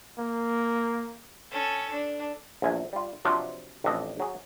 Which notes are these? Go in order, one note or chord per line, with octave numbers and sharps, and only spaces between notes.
A#3
C#4 A4
D4
A#1 E2 G#5
G3 F4
C3 F3 F#3 D4 F4
A1 F2 D4 A4 D#5
F#3 G#4